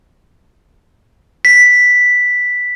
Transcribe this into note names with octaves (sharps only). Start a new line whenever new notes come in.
B6